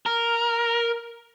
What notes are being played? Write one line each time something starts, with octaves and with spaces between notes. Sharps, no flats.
A#4